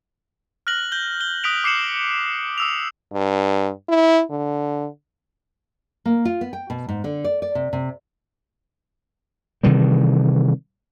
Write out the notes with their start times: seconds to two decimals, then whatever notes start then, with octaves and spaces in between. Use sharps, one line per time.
0.67 F6 F#6 A#6 F#7
0.92 G6 G7
1.21 G7
1.44 D#6 F#6 B6 D7 F7
1.64 D6 C7 C#7 E7 F#7
2.58 D#6 E6 F7
3.13 G2
3.88 E4
4.30 D3
6.06 A#3
6.25 F4
6.41 B3
6.53 G5
6.70 B2
6.89 G#2
7.04 D3
7.24 D5
7.42 D5
7.55 C3
7.73 C3
9.63 C3 D#3 E3 G3